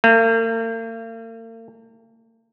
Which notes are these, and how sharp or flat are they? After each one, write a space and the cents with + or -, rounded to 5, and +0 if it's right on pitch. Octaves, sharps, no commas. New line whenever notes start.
A#3 -45